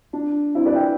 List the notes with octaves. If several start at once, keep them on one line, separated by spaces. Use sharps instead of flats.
D4
C4 E4
B4 D5
E5 G5